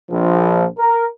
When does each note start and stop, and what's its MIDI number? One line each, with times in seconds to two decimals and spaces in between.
0.11 0.66 34
0.11 0.66 53
0.79 1.06 70